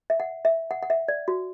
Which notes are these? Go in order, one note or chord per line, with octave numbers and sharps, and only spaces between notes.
E5
F#5
E5
F#5
F#5
E5
D5
F#4